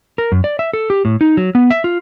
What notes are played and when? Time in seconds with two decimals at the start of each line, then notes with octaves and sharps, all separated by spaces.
0.18 A#4
0.32 F#2
0.44 D5
0.59 E5
0.73 A4
0.90 G4
1.05 A2
1.21 D#4
1.37 F#3
1.55 B3
1.70 E5
1.84 F4